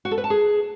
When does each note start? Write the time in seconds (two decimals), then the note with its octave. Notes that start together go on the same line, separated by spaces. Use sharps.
0.05 F#4
0.11 A4
0.18 B4
0.24 A5
0.30 G#4